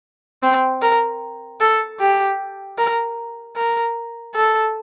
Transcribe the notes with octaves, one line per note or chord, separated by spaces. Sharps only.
C4
A#4
A4
G4
A#4
A#4
A4